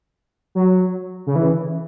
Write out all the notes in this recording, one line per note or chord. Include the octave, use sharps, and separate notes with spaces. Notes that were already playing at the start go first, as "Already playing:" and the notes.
F#3
C#3
E3